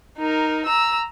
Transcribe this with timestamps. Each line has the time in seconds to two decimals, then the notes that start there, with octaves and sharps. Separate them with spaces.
0.18 D#4 A#4
0.66 A#5 E6